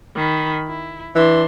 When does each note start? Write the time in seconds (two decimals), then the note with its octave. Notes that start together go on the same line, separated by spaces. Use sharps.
0.15 D#3 B5
0.68 E4
1.15 E3 D4 C6